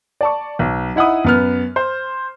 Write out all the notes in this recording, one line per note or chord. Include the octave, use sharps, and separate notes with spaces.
D5 A5 C#6
B1
D#4 E4 F#5 B5 D#6
F#2 B3 F6
C5